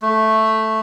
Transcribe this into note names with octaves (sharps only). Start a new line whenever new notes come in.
A3